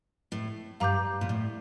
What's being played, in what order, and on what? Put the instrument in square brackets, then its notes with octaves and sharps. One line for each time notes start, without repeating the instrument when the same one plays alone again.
[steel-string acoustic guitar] A2
[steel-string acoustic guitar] G2 [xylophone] F5 A#5 D6 G6
[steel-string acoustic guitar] A#2
A2